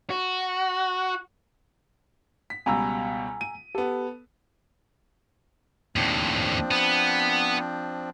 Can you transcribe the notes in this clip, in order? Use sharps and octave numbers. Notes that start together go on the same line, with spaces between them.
F#4
B6
C#2 B2 G3 G#5 A#5 E6
D#7
B3 G4 A4
D#2 A2 F3 C4 D4
B3